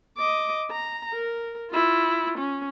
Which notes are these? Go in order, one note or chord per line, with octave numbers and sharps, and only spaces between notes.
D#5 D6
A#5
A#4
E4 F4
C#4